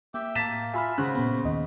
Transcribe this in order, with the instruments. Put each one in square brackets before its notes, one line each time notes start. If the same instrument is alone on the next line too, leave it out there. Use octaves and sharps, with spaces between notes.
[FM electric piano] A#3 [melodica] G4 E5 G5
[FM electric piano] A2 A5 [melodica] A#3 [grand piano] A6 B6 E7
[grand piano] F4 [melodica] E5 [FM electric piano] G#5 B5 F6
[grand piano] C#3 [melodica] F#4 C5 [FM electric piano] F#6
[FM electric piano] A#2 A#3 B3
D#2 D#3 D#5